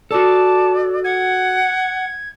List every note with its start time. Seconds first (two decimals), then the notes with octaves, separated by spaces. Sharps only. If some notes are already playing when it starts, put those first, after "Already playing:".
0.11 F#4 A4 D5 A5
1.04 F#5 G#6